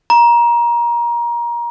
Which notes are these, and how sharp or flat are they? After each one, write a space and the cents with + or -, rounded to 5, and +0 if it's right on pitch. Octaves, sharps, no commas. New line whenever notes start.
A#5 +25